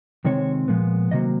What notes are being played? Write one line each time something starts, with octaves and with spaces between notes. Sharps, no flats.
C3 D#3 G#3 C4 C#5
A#2 F3 G#3 B3
C3 D#3 F#3 A#3 D#5